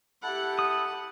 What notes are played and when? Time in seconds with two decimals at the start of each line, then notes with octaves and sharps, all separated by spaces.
0.23 E4 G4 A4 F#5
0.59 D#6